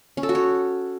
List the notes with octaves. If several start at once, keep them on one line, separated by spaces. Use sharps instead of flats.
C#4
A4
F#4
C#5